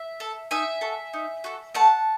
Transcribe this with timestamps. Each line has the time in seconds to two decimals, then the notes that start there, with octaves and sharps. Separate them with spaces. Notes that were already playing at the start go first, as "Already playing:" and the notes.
Already playing: E5
0.20 A4
0.51 D#4 E5 G#5
0.81 F#4 A4
1.13 D#4
1.44 F#4 A4
1.74 A3 F#5 A5